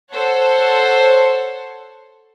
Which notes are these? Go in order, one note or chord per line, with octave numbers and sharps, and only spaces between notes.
A4 C5 C#5 F#5 A5